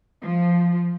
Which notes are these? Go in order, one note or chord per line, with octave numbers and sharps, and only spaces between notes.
F3